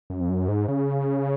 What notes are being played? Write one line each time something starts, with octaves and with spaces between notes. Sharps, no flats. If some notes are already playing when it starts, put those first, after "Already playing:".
F#2
F2
F#2
G#2
C#3